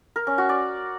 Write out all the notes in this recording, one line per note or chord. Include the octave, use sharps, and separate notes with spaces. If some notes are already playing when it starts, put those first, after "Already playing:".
A#4
C#4
F#4
D5